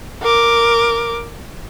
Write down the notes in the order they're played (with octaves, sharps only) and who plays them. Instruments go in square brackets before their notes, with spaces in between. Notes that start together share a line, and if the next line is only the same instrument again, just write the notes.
[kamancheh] A#4 D6